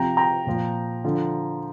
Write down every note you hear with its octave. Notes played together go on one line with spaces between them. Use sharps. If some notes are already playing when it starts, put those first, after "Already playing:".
Already playing: C3 F3 G5 A#5
G5 A#5
A#2 F3
D3 F3